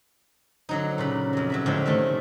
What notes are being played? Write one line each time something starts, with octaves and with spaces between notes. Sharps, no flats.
D3 F#3 D#4
A#2 C#3 B5
F2 F#3
F#3 E5 B5
A2 D3 F3 G#3
C3 D#3 A3